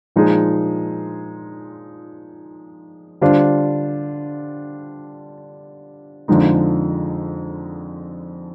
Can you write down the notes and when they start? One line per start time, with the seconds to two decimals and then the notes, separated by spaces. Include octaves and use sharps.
0.16 A#2 F3 G#3 D#4 G#4
3.21 D3 G3 D4 F4 C5
6.28 F2 D3 F3 G#3 D#4